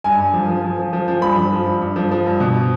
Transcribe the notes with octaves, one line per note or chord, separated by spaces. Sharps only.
G2 G#5
G2
F3
F3
F3
F3
F3
F3
G2 B5
F3
F3
G2
G2
F3
F3
G2
B2